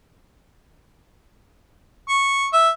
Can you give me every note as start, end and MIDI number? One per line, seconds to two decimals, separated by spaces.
2.09 2.45 85
2.53 2.69 76